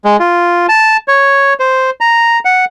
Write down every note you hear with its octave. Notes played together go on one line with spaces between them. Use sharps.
G#3
F4
A5
C#5
C5
A#5
F#5